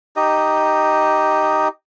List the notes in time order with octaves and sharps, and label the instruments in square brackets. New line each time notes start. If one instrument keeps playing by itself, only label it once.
[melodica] D#4 G4 D#5